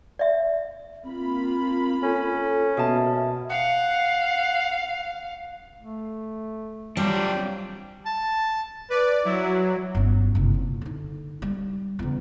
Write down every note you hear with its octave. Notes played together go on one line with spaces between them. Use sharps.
D5 E5
A#3 C4 F4 B5
C#4 A4
B2 A#3 E5 A5
F5 F#5
A3
F#3 G3 C4 D4 F4 G4
A5
B4 D5
F#3 E4
G1 C#4
F#1 C3
A#2
D3 D#4
G3
E2 C#3